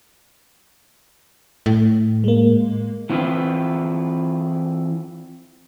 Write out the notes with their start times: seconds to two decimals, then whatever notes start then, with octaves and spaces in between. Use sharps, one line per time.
1.66 A2
2.24 G#3 A#3
3.10 E3 C4 E4 F4 B4